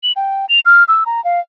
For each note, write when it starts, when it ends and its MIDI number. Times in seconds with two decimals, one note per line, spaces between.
0.03 0.12 102
0.16 0.46 79
0.49 0.60 101
0.65 0.84 89
0.88 1.04 88
1.06 1.23 82
1.24 1.40 77